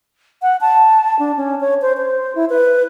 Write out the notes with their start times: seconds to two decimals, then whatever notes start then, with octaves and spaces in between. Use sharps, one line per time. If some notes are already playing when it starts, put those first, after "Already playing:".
0.42 F#5
0.61 A5
1.19 D4
1.37 C#4
1.61 C#5
1.82 C5
1.97 C5
2.35 E4
2.50 B4